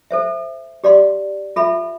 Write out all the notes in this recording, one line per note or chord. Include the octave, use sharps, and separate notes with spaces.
A4 C5 E5
G4 D5 F5 C6
F4 A4 E5 B5